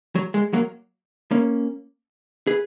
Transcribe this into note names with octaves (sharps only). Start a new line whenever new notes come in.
F#3
G#3
F#3 A#3
A#3 C#4
G#4 B4